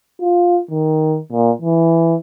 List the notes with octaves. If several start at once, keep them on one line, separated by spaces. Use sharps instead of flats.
F4
D#3
A#2
E3